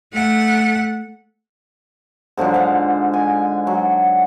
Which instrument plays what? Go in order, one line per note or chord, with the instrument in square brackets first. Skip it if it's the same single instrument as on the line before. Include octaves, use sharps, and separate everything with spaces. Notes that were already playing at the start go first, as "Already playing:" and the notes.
[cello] A3 F#5
[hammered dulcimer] G#2 D3 F3 F#3
F5 F#5
G#5
F#3